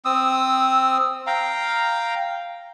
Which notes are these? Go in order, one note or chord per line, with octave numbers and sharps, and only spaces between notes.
C4 D#6 E6
F5 G5 A#5